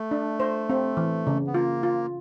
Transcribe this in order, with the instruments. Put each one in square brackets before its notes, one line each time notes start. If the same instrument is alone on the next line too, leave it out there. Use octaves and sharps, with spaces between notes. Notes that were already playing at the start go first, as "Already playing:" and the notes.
Already playing: [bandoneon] A3
[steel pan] D4
C5
C4
E3
C#3
[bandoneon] B3
[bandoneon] A#3 [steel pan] F4
[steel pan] F4